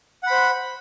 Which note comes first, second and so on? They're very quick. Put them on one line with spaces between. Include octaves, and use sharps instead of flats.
F#5 B5 C5